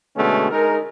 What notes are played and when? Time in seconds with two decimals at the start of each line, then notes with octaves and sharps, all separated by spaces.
0.16 B2 D3 G#3 A3 B3 C#4
0.51 G#3 D#4 G#4 A#4